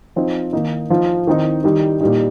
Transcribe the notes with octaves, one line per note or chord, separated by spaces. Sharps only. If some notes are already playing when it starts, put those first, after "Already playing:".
F3 C4 D#4
D#3 A#3 D#4
F3 D#4
D#3 C4 D#4
D#3 G3 D#4
A#2 G3 D#4